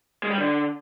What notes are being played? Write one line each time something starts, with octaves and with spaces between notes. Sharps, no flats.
G#3
G3
D3